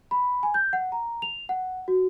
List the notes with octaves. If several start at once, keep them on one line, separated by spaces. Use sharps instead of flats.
B5
G#5
G6
F#5
A#5
F7
F#5
F#4